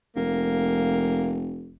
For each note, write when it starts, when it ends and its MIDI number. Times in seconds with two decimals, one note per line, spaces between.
0.16 1.77 29
0.16 1.41 58